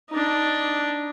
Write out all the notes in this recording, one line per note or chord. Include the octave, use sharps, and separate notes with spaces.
D4 D#4